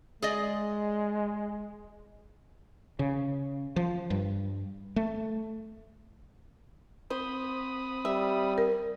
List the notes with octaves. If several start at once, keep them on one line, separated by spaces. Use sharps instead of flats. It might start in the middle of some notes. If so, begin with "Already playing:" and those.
G#3 G#4 D5 D#5
C#3
F3
G2
A3
C4 C5 B5 D#6
G3 E5
A#4